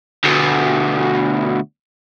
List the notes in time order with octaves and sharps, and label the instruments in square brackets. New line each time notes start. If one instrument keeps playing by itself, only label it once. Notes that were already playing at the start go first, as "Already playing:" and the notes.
[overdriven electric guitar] D2 B2